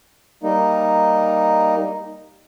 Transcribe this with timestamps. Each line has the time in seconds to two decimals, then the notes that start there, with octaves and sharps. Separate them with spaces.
0.43 G3 A#3 D#4